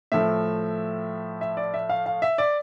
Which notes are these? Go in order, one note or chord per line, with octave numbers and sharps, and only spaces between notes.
A2 F3 A3 E5
E5
D5
E5
F5
F5
E5
D5